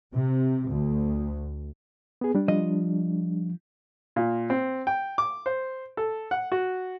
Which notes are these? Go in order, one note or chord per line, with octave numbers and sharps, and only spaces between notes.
C3
D2
B3 G#4
G3 D4
F3 D#5
A#2
C4
G5
D6
C5
A4
F#5
F#4